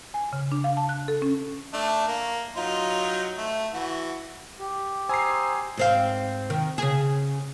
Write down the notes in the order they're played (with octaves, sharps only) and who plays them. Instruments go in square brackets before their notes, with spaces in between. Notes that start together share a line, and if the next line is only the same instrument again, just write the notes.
[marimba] G#5
C#3
D4
F5
A5
F#6
A4
C#4
[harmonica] A3 D4
A#3
F#3 D#4 F4
A3
E3 F#4
[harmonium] G4
[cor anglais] C5 [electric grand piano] G#5 C7 [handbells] A#5 D#6 E6
[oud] G#2 C4 F5
D#3
C#3 G#4